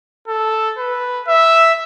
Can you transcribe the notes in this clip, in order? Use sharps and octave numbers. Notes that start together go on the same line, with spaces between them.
A4
B4
E5